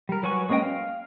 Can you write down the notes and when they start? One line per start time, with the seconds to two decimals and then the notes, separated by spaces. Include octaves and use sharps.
0.09 G3 A#4
0.23 F#3 F#4 B4 G#5 C#6
0.49 G#3 A#3 C#4 D#5 G5
0.62 F5